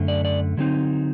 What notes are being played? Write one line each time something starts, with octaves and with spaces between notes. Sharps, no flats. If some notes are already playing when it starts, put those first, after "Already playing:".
Already playing: F#2 D3 A3
D5
D5
D3 F#3 C4 D#4